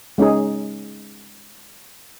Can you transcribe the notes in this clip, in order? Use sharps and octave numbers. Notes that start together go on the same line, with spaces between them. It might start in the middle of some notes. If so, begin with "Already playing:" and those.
G#3 C#4 D#4 G#4